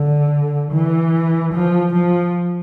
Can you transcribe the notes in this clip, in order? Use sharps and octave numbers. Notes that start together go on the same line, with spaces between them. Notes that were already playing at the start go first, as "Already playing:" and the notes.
Already playing: D3
E3
F3
F3